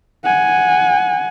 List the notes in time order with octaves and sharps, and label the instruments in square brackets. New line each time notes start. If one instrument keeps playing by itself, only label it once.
[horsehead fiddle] F#5 G#5